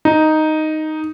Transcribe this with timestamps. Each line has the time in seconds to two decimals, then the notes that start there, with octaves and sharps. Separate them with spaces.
0.05 D#4